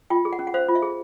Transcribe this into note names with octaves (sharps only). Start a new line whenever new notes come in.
F4 G5
G#4
F#5
C#4
F#5
C5 F5
F4
E5
G#4